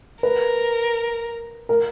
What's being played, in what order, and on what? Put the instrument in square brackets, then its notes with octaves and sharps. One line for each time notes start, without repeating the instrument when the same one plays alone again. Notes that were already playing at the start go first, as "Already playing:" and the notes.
[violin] A#4 [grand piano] B4
[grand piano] A#4